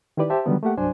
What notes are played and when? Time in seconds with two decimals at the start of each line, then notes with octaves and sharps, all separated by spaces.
0.17 D#3 D#4 E4 G4 B4 D5
0.30 G4 C5 E5 A5
0.46 D3 D#3 F#3 G3 B3
0.63 A3 A#3 G4 F#5
0.77 C2 G2 F#3 D4 C5 G#5